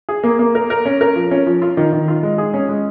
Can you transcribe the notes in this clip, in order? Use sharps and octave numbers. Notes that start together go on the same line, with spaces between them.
G#4
A#3
A#3
A#4
A#4
C#4
A#4
F3
C#4
F3
F4
D#3
D#3
F4
G#3
G#4
C#4
G#3